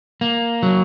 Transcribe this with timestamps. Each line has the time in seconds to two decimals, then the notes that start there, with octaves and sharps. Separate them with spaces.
0.21 A#3
0.63 F#3